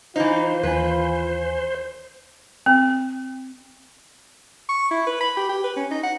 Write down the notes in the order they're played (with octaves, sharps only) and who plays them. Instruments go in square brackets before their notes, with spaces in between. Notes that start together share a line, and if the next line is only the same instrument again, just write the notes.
[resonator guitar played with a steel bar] E3 D#4 [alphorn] F4 [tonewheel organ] C5
[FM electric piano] D#2 E3 G#5 [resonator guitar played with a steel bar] B4
[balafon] C4
[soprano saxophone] C#6
E4
B4
B5
G4
G4
B4
C#4
D#4
F#5